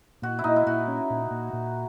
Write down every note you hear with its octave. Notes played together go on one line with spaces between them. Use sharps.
A#2 F#4
E4
A#2 D#4
E4
A#2 F#4
C#4
A#2
A#2
A#2